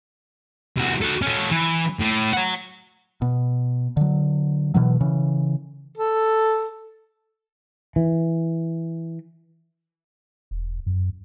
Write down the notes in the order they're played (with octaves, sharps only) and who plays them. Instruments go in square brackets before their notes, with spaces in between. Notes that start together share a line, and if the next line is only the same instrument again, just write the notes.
[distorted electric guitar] C2 F#4
F#4 A4
C#4 A4
E3
A2
C#5 F#5
[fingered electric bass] B2
D3 F#3
B2 E3 F#3
C#3 E3
[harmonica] A4
[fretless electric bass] E3
[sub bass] E1
F#2